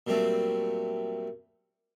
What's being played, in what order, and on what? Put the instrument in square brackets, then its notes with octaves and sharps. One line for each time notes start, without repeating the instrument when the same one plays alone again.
[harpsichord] A#2 F#3 G3 A3 C4